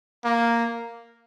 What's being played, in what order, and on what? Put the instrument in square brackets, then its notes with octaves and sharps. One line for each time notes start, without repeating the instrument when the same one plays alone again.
[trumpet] A#3